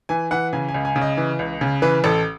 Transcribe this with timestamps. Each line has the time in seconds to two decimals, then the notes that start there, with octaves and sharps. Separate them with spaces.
0.09 E3 G#5
0.31 E3 F#5
0.53 C#3 G#5
0.69 G#5
0.74 C#2
0.85 G#5
0.96 C#3
1.02 D#5
1.17 E3
1.39 C#2
1.61 C#3
1.82 E3 B4
2.04 A1 A4